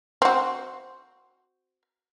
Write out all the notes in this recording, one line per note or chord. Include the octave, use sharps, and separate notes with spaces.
C4 F#4